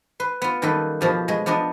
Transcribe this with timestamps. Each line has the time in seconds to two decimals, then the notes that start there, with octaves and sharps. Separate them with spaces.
0.20 B4 C6
0.42 B3 F4
0.62 F#2 D#3 G3 A#3 A4 B4
1.01 B2 F3 G4
1.28 B2 G#3
1.46 F3 B3 D4 D5 D#5